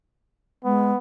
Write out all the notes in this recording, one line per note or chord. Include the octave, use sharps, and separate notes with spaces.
G#3 B3